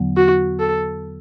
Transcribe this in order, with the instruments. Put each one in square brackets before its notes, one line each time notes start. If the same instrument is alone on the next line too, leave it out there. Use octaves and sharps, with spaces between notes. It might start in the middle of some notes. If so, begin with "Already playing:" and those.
Already playing: [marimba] E2 D3 F#3 B3
[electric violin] F#4
A4